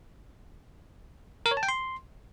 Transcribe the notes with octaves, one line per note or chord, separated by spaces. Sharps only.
A#4
C#5
A5
G5
C6